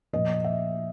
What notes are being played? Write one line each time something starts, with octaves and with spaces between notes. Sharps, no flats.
A#2 F3 D#5
E5